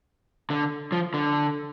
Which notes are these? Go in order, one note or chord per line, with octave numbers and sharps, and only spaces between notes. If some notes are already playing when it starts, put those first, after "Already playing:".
D3
F3
D3